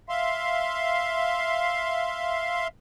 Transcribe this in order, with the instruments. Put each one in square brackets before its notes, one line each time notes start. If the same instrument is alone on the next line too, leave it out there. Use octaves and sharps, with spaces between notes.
[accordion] E5 F5 C6